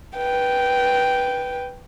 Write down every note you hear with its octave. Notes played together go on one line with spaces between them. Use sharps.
B4 G5